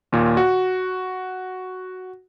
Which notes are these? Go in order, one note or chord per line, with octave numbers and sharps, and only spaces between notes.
D#2 A#2
F#4